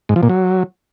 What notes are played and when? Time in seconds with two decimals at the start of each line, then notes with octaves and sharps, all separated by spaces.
0.09 G#2
0.16 F3
0.23 A#2
0.29 F#3